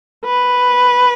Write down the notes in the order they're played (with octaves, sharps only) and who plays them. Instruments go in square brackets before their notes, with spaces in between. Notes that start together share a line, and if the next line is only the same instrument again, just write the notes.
[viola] B4